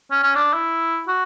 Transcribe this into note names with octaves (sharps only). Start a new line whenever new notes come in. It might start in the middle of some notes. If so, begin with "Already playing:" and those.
C#4
C#4
D4
E4
F#4